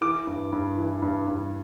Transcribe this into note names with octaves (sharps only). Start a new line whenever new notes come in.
E3 D6
G2
G2
E3
G2
G2